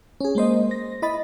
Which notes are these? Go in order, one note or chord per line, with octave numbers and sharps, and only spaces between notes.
C#4 G#4
G#3 A#3 C5 D#5
A#6
E4 D#5 B5 A6